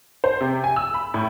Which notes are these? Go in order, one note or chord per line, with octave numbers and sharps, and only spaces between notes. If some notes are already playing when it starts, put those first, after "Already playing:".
C5
C3
G#5
E6
B5
A2